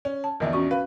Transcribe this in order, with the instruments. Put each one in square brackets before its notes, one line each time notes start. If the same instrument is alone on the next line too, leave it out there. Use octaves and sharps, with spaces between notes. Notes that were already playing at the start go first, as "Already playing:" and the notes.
[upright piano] C#4
[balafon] A5
[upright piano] A#1 E2 D4 [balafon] A#4 D#5 E5
[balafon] C#4 F#4 C#6
[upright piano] B4 [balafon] F5